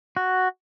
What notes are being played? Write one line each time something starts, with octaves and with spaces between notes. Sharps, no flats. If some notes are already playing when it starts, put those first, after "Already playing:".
F#4